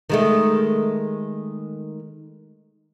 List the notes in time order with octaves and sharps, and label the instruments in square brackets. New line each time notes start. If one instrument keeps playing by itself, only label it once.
[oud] D#3 G#3 A3